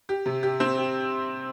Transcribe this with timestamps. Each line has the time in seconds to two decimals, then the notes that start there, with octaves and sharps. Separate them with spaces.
0.09 G4
0.26 C3
0.43 G4
0.60 C4
0.77 G4